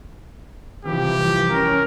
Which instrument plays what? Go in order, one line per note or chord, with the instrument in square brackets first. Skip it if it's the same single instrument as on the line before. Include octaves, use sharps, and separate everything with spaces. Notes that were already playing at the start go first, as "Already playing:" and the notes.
[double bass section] C2 E3 F3 [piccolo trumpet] G4
[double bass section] C#4 [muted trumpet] A#4